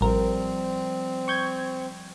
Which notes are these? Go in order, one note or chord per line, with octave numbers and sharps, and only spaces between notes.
A1 F3 G3 C4 A#4
C#6 G6 G#6